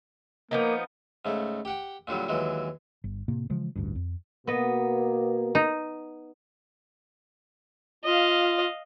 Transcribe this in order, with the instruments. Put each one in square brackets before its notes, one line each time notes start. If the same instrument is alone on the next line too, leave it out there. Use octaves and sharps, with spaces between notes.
[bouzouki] F3 B3 D#4 [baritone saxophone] A#3
[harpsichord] G#2 C#3 A3
G4 F#5 G5
A#2 D3 F#3 G3
D#2 E3 F#3 G#3
[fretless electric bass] G1
A2 C3 A#3
C#3 E3 F3 G#3
A1 D2 G2
F2
[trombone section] B2 A#3 [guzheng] B3 D#5
[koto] D#4
[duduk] F4 [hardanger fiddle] D#5 F5